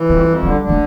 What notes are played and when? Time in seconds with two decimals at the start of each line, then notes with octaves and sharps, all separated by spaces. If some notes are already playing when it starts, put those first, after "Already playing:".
Already playing: E3
0.09 F2 G3
0.26 F2
0.43 D3 G3
0.61 D3
0.69 A3